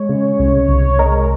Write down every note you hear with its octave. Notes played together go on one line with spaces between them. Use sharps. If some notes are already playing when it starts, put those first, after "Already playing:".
Already playing: G#3 C#5
C#3
C2
C2
G#3 A#4